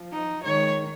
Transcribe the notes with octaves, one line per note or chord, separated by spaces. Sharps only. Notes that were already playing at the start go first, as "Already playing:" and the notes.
Already playing: F3
D#4
D#3 G#3 C#5